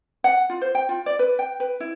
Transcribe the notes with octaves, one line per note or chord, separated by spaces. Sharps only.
F#5
F4
C5
G5
F4
D5
B4
G5
B4
E4